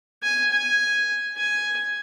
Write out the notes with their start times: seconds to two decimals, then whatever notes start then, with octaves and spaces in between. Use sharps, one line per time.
0.23 G#5
0.51 G#5
1.37 G#5